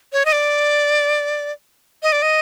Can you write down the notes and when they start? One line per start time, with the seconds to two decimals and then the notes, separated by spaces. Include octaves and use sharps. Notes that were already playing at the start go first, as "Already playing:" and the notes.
0.13 C#5
0.25 D#5
0.32 D5
2.03 D#5
2.12 D5
2.22 D#5